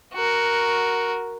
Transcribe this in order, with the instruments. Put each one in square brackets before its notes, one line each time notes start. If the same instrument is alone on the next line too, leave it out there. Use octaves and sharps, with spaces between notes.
[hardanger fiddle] F#4 A#4